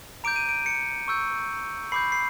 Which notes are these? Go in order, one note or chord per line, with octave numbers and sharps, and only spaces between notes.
A#5 D6 G6 D7
D#7
D7
C#7
C#6 E6 G6
B5 D6 G6 C7
C7